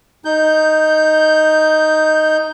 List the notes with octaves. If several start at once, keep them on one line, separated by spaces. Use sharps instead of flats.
D#4 G6